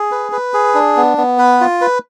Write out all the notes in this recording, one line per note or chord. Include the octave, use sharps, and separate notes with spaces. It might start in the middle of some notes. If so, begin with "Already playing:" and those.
Already playing: G#4
B4
B4
G#4
D4
B3
B3
B4
F4
B4